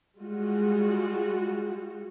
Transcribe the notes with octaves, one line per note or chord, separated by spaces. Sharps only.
G3 G#3 F4 F#4